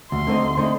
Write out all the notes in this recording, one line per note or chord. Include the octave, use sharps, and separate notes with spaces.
D2 C6
D3 A3 C4 D#4
D2
D3 A3 C4 D#4